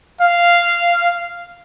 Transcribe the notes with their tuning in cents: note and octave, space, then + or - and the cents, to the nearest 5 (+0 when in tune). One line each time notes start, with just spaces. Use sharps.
F5 -10